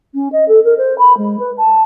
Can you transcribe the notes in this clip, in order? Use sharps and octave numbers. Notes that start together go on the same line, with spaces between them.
C#4
D#5
A4
A#4
C5
B5
G#3
B4
A5